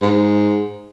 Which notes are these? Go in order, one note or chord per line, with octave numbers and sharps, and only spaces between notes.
G#2